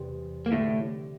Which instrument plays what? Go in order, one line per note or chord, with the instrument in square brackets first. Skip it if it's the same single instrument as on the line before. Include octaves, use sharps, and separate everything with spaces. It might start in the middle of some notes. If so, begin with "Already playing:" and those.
Already playing: [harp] E2 C3 G3 C4
[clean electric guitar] A#3
[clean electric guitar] A2 A3 [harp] D3 G3 D4